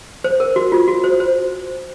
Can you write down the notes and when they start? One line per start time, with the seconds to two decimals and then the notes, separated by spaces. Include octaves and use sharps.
0.24 C5
0.40 A#4
0.56 F#4
0.72 F4
0.88 F#4
1.04 C5
1.20 C5